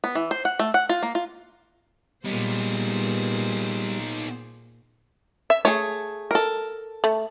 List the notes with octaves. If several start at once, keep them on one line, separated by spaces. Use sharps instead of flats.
B3
E3
C5
F#5
A3
F#5
F4
A#3
F4
A#2 G3 B3 D#4 G#4 C5
E5
A3 G#4 C#5
A4 A#4
A3